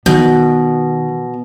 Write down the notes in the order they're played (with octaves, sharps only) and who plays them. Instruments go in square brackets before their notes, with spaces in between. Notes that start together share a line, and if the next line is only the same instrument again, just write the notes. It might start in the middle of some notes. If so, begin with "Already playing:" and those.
[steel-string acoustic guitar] B2 [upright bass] D#3